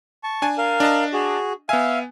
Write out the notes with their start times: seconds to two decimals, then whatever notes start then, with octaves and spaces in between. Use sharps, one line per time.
0.23 A5 C#6
0.42 D4 G#5
0.58 A#4 F5
0.80 D4 D#5 A5
1.13 F#4 G#4
1.69 B3 E5 F5 G#5